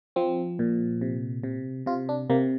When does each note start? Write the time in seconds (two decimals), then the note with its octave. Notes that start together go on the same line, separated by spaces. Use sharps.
0.16 F3 C4
0.59 A#2
1.01 C3
1.43 C3
1.86 C3 F4
2.09 D4
2.30 C3 A#3